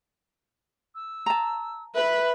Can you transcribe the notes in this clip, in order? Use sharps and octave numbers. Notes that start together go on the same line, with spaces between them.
E6
A5 A#5
B4 E5 B5